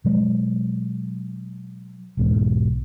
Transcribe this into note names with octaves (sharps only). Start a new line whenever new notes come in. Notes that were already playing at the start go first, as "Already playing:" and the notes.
B2 F#3 G#3
B1 E2 G#2 B2